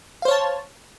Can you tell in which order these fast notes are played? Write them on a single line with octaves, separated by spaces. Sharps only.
F5 C5 C#5 A5